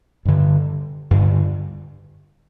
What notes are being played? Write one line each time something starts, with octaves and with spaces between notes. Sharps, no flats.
G2 D3
G2 D3